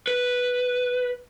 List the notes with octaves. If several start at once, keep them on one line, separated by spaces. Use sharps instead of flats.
B4